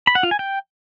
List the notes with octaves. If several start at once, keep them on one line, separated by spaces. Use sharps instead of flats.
B5
F#5
F4
G#5
G5